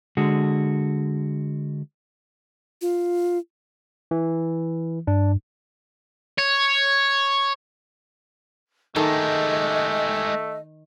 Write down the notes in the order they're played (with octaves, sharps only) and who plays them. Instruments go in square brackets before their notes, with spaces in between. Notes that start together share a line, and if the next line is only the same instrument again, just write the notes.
[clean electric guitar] D3 G#3 F#4
[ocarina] F4
[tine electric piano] E3
[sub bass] G2 [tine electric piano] D4
[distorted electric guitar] C#5
[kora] D#3 A4 [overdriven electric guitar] G#3 G4 [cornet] A3 [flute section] D#5